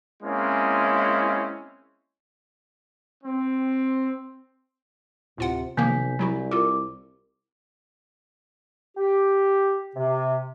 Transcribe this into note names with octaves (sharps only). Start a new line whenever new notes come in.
G#3 A#3 C4 C#4 E4
C4
D1 A2 C3 F4 F#5
B1 C3 D#3 F3 A#3 G#5 G6 B6
C2 F#3 E4 F#4
F4 A4 A#4 D6
G4
C3